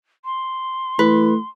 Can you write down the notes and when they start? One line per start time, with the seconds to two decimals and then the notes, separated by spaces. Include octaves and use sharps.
0.25 C6
0.99 E3 A3 B4